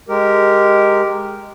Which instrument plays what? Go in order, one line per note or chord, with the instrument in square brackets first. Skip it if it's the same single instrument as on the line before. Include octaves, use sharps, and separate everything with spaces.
[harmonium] G#3 G4 A#4